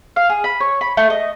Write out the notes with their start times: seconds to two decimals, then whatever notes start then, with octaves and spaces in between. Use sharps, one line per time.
0.16 F5
0.29 G#4
0.44 B5
0.60 C#5
0.81 B5
0.97 A3
1.10 D#5